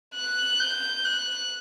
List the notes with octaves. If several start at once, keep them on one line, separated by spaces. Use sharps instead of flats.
F#6
G6
F#6